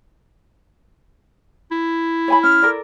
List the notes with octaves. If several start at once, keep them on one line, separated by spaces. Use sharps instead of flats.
E4
C#5 G#5 B5
C#4 F6
A4 A#4 D5